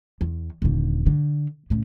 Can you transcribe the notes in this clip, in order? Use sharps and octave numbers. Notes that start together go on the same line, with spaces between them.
E2
D#1 D3
D3
A2 C#3